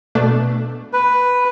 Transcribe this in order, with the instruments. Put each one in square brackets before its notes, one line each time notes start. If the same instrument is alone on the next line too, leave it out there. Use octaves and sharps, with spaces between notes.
[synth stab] B2 A3 D4
[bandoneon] B4